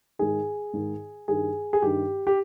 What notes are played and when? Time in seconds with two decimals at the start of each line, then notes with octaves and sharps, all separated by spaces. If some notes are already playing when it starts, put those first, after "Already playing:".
0.19 G#2 D#3 G#4
0.73 G#2 D#3
1.28 G2 D#3 G#4
1.73 G#4
1.82 G2 D#3 G4
2.27 G4